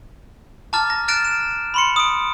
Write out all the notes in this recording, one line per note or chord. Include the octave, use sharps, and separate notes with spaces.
A5 A#5 D6 F6 A6
A#6
F6 F#6 A6 A#6 D7 E7
E7
B5 C6 C#7
D#6 D7